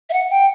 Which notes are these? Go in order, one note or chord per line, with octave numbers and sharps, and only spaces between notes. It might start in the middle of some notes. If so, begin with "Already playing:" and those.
E5
F#5
G5